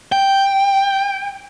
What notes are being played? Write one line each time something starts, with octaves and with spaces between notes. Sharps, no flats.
G5